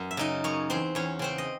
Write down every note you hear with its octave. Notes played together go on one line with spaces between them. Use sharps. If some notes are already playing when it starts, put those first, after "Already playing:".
Already playing: F#2
E5
C#3 D#4 D#5
F#2 C#4 C#5
E2 C4 C5
E2 C#4 C#5
C#3 C4 C5
D#5